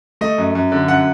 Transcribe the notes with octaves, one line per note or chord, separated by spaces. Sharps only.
A3 D#5
F#2
F#2
D3
F#2 F#5